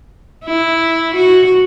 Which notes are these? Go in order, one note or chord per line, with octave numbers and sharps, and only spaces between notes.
E4
F#4